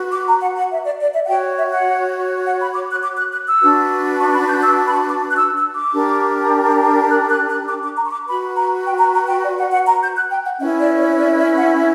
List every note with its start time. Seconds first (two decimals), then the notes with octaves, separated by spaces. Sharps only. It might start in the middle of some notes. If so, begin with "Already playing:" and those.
Already playing: F#4 B4
0.12 D6
0.27 A#5
0.41 F#5
0.55 F#5
0.71 E5
0.85 D5
1.00 D5
1.14 E5
1.25 F#5
1.29 F#4 C#5 G5
1.58 E5
1.72 F#5
2.45 F#5
2.60 B5
2.74 D6
2.89 F#6
3.03 D6
3.18 F#6
3.32 F#6
3.47 E6
3.61 D4 F#4 B4
4.19 C#6
4.34 B5
4.48 G6
4.63 E6
4.86 B5
4.92 C#6
5.07 D6
5.28 F#6
5.36 E6
5.56 E6
5.74 D6
5.94 D4 G4 A#4
7.10 F#6
7.29 F#6
7.49 F#6
7.68 D6
7.83 D6
7.97 A#5
8.05 C#6
8.11 D6
8.26 F#4 B4 B5
8.55 A#5
8.85 G5
8.99 A#5
9.14 A#5
9.28 G5
9.44 D5
9.57 F#5
9.72 F#5
9.86 A#5
10.01 G6
10.15 F#6
10.30 G5
10.45 F#5
10.59 C#4 E4 B4 E5
10.79 D5
10.97 C#5
11.11 C#5
11.17 D5
11.36 E5
11.56 F#5